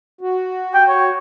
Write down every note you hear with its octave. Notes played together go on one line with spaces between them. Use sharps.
F#4
G5
C#5